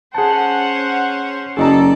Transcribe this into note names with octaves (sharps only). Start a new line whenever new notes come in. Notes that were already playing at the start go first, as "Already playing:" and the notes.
C#4 G#4 C5 F#5 A5
F#1 G#4 A4 D5 D#5 A5 A#5